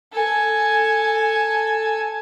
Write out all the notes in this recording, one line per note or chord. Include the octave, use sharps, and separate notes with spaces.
A4 G#5